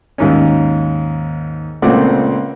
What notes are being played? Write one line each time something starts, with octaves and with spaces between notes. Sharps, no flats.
D#2 G#2 C#4
C#2 A#2 A3 C4 F#5 D6